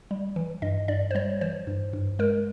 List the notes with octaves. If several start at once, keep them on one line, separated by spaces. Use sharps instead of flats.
G3
E3
G2 D#5
G2 D5
C5
G3 C#5
E3 C5
G2
G2
G#3 A#4